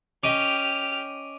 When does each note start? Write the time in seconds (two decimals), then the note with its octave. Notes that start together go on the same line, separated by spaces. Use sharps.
0.23 C#4 G4 D#5 D6 F6 D7 D#7